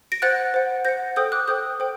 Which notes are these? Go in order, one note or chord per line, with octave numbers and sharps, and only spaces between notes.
A#6 D7
C5 F#5 F#6 A6
C5 F#5
C5 F#5 G6 A#6
A4 C5 G5 D#6 G6
D6 F#6
A4 C5 G5 D#6 G6
A4 C5 G5